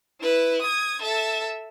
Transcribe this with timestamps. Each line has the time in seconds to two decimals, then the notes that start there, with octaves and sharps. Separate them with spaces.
0.21 E4 B4
0.62 D#6 G#6
1.01 A4 E5